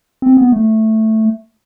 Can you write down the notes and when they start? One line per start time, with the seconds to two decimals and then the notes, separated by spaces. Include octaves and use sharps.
0.22 C4
0.37 B3
0.52 A3